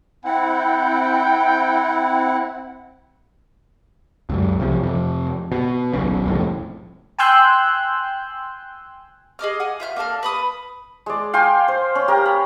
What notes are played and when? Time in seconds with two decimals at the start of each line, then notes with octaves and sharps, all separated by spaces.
0.25 C4 E4 F#5 G5
4.29 C#2 F#2
4.59 C2 C3 F3
4.83 F2 C3
5.52 B2
5.93 D#1 B1 C#3
6.26 E1 C2 F2 A2
7.19 G5 G#5 C6 E6 F#6 G6
9.39 G#4 D#5 D6 F6
9.60 F#5 G#5
9.80 F4 E5 F6
9.96 A#3 D4 A4 F6
10.23 B4 B5 D#6
11.06 G#3 D5
11.34 F5 G5 G#5 C6
11.68 C5
11.95 C#4
12.08 G4 A#4 A#5
12.26 B5